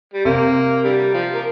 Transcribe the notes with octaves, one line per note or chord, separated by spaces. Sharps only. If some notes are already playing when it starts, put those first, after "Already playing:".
G3
C3 A#3 C4
D3 G3
F3
A#3